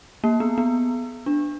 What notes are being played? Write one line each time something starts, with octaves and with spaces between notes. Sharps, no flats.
A#3
B3
B3
D4